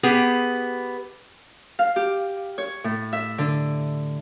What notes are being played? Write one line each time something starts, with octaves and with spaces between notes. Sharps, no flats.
B3 G4 G#4
F5
G4
C#5
A2
E5
D3